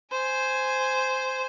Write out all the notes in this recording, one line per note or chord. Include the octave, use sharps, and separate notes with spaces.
C5 G#5